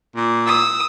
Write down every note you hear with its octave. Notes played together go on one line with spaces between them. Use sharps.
A#2
D#6 E6